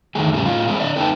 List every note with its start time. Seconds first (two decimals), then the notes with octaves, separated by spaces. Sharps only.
0.15 E2 D#3 A3 G#4
0.33 F2 A2 C#3 G3 A#3 E4
0.45 A2 F4 D#5 F5
0.68 G#3 A#3 C4 E4
0.80 D3 D5 D#5
0.96 A3 C4 D#4 A4 B4 G5